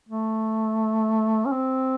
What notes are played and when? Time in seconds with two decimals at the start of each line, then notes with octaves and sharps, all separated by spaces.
0.09 A3
1.46 C#4
1.52 C4